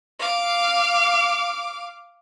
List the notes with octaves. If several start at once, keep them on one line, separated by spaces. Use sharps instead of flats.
F5 D6